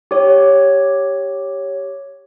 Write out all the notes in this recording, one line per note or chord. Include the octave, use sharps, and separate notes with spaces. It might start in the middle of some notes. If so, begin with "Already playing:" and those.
G4 C#5